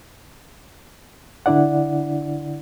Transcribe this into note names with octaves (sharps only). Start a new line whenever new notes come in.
D3 D4 E4 D5 F#5